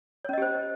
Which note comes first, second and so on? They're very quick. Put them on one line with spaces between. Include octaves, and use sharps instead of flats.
C#5 C#4 D#5 G4 C5